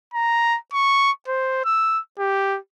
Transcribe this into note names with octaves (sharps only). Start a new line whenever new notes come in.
A#5
C#6
C5
E6
G4